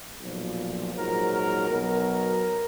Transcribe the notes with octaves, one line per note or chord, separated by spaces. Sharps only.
B1 A#2 F3
A#1 G#2 F#3 A#4
A#4
B1 B2 F#3 A#4